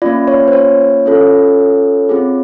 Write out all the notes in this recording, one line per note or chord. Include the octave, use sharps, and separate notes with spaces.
A#3 C#4 F4 D5
C#5
C5
C#5
C#4 F4 A4
C4 F4 G#4